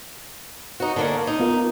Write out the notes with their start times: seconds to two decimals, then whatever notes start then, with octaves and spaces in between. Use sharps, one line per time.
0.80 D#4 F#4
0.96 D3 A#3 C#4
1.27 D#4
1.40 B3 F4 A#4